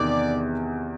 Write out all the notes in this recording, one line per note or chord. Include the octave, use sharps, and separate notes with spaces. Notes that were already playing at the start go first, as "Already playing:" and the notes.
Already playing: E2 C3 D#3 D5